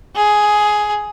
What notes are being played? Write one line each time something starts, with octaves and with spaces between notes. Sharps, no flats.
G#4